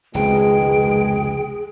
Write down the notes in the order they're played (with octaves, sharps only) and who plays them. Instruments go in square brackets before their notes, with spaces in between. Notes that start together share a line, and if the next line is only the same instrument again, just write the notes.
[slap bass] F1 C#2 [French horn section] B2 D#3 G#3 [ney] G#4 [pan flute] G5